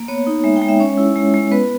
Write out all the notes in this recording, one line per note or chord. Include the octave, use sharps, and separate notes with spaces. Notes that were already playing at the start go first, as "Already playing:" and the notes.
Already playing: A#3
B3 C#5
D#4
G#3 E5
G5
G#3
E5
C#4 C#5
E4
G#3
G#3
B3 B4